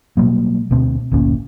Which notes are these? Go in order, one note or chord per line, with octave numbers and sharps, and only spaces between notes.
B2 F#3 G3 A#3
D2 B2 C4
G1 D2 A#2 C#4